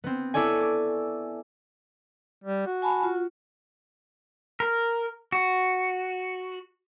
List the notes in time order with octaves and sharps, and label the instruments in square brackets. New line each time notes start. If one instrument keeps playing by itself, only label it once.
[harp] B3 C4
E4 A4 C#5 D5 G#5
D6
[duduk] G3
F#4
[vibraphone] G#5 A5 B5
F4
[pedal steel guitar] A#4
F#4